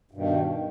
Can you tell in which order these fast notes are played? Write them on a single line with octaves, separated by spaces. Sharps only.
G2 B2 D#3